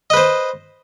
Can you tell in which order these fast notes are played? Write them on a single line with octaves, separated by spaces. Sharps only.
D#5 B4 C5